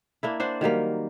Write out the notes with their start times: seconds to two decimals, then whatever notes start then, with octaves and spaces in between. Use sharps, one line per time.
0.23 A#3 D4 E4
0.40 D4 C5 F#5
0.61 D#3 F#3 G3 A#3